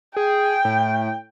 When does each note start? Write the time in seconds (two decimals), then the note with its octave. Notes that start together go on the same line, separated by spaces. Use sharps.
0.16 G#4 G5
0.65 A2